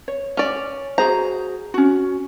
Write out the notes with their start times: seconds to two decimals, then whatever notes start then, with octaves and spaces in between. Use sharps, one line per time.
0.08 C#5
0.37 C#4 D5
0.98 F#4 G#4 C5 A#5
1.74 C#4 F#4